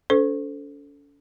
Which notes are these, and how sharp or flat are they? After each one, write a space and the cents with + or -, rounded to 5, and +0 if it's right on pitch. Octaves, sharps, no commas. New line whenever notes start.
C#4 +45 A4 +0 C5 -20